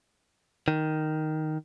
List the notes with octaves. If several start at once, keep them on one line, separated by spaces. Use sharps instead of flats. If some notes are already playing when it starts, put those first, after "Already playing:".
D#3